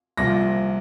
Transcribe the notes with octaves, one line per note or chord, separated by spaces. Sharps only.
C2 A#2 F3 A#6